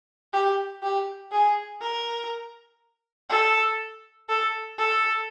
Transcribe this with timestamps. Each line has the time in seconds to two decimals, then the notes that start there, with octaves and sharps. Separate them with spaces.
0.33 G4
0.83 G4
1.32 G#4
1.82 A#4
3.30 A4
4.29 A4
4.78 A4